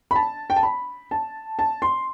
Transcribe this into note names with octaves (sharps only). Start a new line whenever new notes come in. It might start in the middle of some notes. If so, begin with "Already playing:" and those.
B5
A5
G5
A5
B5
A5
A5
C6